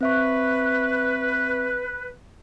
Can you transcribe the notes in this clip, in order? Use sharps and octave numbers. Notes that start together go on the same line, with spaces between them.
C4 B4 E5 C#6